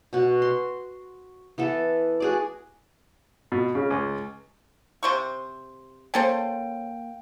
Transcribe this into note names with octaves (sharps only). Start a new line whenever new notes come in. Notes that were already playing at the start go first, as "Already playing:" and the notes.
B2 F#4
C6
E3 B3 A4
F#4 G#4 D5
B2
C#3
C#2
C3 C5 C#6
A#3 C#4 A4 C5 G5